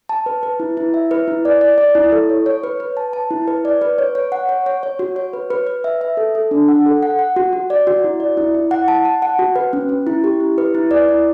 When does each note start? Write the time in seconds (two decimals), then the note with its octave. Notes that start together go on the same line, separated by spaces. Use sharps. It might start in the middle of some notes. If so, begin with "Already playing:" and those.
0.09 A5
0.26 B4
0.43 B4
0.60 E4
0.77 E4
0.94 E5
1.11 B4
1.28 E4
1.45 D5
1.61 D5
1.78 D5
1.95 E4
2.12 A4
2.29 C#5
2.46 C#5
2.63 B4
2.80 B4
2.97 A5
3.13 A5
3.31 E4
3.48 B4
3.65 D5
3.81 B4
3.98 C#5
4.15 C#5
4.32 F#5
4.49 C#5
4.66 C#5
4.83 C#5
4.99 F#4
5.16 C#5
5.33 B4
5.50 B4
5.67 B4
5.84 E5
6.01 E5
6.17 A4
6.35 A4
6.51 D4
6.68 F#5
6.86 A4
7.03 F#5
7.19 F#5
7.36 F#4
7.53 F#4
7.70 D5
7.87 F#4
8.04 E4
8.20 D5
8.37 E4
8.55 E4
8.71 F#5
8.88 A5
9.05 A5
9.22 F#5
9.39 F#4
9.56 B4
9.73 C#4
9.89 C#4
10.07 E4
10.24 G4
10.40 E4
10.58 B4
10.74 E4
10.91 D5
11.09 E4